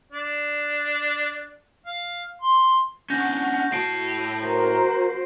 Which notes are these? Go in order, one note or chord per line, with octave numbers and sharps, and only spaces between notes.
D4
F5
C6
C#4 D4 F#5 C#6 G6 A#6
A2 F#4 A5 C7 D7
F#4 A#4 C5 A#5